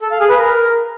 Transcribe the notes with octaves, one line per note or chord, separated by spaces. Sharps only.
A4
F5
G#4
B4
A#4